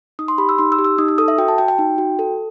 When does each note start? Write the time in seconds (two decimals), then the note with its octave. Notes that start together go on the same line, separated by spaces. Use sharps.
0.19 D#4 D#6
0.28 C6
0.38 G4 B5
0.49 E6
0.58 D#4 C6
0.72 E6
0.79 G4
0.84 E6
0.98 D#4 D#6
1.08 E6
1.18 A4 D#6
1.28 E5
1.38 F#4 G5
1.48 A5
1.58 F#4 G5
1.68 G5
1.78 D#4
1.98 F#4
2.19 A4